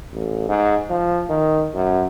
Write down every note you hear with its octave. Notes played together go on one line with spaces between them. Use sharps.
A1
G#2
F3
D#3
F#2